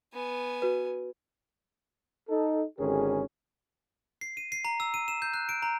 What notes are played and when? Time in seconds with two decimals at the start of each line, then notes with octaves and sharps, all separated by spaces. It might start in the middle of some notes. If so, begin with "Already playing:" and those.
0.14 B3 G#5
0.62 F#4 B4
2.30 D#4 A4
2.78 G#1 D3 C#4 G4 G#4 A#4
4.21 C7
4.37 D#7
4.52 C7
4.65 A#5
4.80 E6
4.94 D#7
5.08 E7
5.22 G6
5.34 F#6
5.49 D7
5.62 A#5